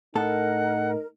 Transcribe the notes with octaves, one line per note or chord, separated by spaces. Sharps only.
A2 D#4 A4 A#4 F#5